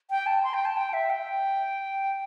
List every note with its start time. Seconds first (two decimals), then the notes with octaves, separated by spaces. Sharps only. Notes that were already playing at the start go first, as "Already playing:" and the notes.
0.10 G5
0.26 A5
0.43 C6
0.54 G5
0.65 A5
0.77 G5
0.93 E5
1.10 G5